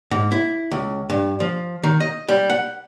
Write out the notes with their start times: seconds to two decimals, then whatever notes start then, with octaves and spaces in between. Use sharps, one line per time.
0.11 G#2
0.32 E4
0.71 C#2
1.10 G2
1.40 F3
1.83 D#3
2.00 D#5
2.29 G3
2.50 F#5